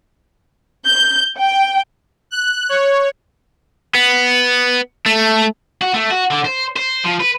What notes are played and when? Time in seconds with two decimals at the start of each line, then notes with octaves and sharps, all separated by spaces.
0.86 G6
1.38 G5
2.31 F#6
2.69 C#5
3.95 B3
5.06 A3
5.81 F#4
5.94 A3
6.11 F#4
6.31 D3
6.45 C5
6.76 C5
7.05 F3
7.20 B4